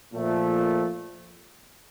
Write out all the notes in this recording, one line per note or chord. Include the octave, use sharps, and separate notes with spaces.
A#2 F3 A3